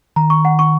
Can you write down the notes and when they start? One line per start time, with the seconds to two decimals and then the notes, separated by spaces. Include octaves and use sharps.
0.16 D#3 A#5
0.30 C#6
0.45 F#5
0.59 C#6